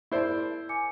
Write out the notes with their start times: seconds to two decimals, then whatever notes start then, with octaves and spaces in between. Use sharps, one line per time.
0.12 E4 G#4 A#4 C5 D5 A5
0.69 G#5 D6 C#7